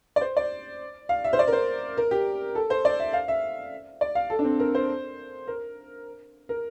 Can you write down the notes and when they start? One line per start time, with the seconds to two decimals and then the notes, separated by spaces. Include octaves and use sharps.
0.16 D5
0.21 C5
0.37 D5
1.09 F5
1.24 E5
1.33 C5
1.39 D5
1.48 A#4
1.53 C5
1.98 A#4
2.11 G4
2.55 A4
2.70 C5
2.85 D5
3.00 E5
3.13 F5
3.28 E5
4.01 D5
4.15 F5
4.30 A4
4.39 D4
4.44 C4
4.60 A#4
4.75 C5
5.48 A#4
6.49 A#4